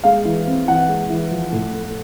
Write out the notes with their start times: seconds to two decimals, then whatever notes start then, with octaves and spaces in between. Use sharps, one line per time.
0.04 G#3 F5
0.25 E3
0.47 C4
0.68 E3 F#5
0.89 G#3
1.10 E3
1.31 F3
1.52 A2
1.73 A3